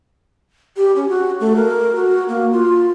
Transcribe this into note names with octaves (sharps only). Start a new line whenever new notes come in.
G4
C#4
F#4
A3
A#4
F#4
A#3
F4